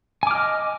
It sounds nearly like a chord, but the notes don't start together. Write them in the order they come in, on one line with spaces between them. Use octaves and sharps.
G#5 D6 F6 D#5